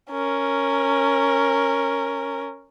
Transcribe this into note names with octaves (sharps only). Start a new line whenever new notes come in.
C#4 A#4